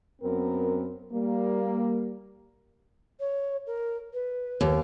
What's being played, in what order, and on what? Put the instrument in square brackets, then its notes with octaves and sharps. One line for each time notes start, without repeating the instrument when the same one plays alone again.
[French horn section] F#2 B3 C4 A#4
G3 A#3
[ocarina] C#5
A#4
B4
[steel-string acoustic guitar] D#2